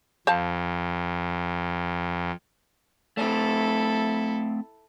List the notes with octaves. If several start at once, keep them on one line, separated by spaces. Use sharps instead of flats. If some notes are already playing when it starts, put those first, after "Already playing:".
F2 C5 F5 A5
A3 C4 E4 A4